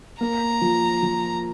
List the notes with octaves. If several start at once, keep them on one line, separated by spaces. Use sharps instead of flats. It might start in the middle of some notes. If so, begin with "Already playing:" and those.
A#3 A#5
F3
F3